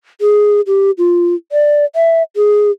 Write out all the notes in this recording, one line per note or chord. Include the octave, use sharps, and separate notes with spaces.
G#4
G4
F4
D5
E5
G#4